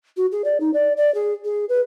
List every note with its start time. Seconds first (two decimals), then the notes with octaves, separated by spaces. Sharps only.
0.17 F#4
0.32 G#4
0.44 D5
0.60 D#4
0.74 D5
0.97 D5
1.14 G#4
1.45 G#4
1.69 B4